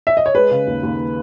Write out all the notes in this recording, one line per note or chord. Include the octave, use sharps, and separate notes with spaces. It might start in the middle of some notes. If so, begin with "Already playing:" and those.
E5
D#5
C#5
G#3 B4
C#3
D#2
D#2